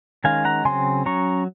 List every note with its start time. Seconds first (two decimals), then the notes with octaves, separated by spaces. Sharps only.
0.24 D#3 G#3 C#4 F5 G#5
0.45 F#5 A#5
0.65 C#3 F#3 C4 G#5 C6
1.06 F#3 C#4 A#5 C#6